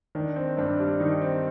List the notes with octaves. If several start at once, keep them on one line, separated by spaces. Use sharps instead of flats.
D#3 D4
C4
G2 D4
G3
D#3 D#4
C4